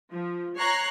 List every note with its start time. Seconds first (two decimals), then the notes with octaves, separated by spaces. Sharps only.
0.11 F3
0.57 C#5 A#5 C#6 F#6 C7